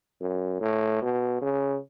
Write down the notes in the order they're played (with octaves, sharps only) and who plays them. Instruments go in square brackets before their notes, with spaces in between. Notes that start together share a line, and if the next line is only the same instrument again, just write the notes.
[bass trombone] F#2
A2
B2
C#3